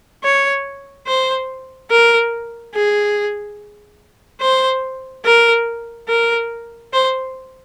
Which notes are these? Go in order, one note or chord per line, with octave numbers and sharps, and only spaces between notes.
C#5
C5
A#4
G#4
C5
A#4
A#4
C5